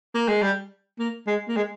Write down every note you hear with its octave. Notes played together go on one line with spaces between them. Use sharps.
A#3
G#3
G3
A#3
G#3
A#3
G#3